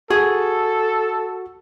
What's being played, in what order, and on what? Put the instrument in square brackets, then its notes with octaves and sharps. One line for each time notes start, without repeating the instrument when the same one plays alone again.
[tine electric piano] F#4 [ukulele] G#4 [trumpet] A4